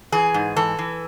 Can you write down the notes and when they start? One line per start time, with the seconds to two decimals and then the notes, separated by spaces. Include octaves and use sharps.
0.12 E3 G#4
0.34 G#2
0.56 E3 A4
0.79 E3